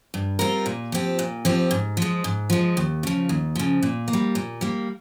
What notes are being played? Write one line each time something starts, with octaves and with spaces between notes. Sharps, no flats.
G2
G3 C4 F4 A#4
A#2
F3 C4 G4
A#2
F3 C4 G4
G#2
F3 G#3
G#2
F3 G#3
D#2
C#3 F3
D#2
C#3 F3
A#2
A#3
G3
A#2
G3 A#3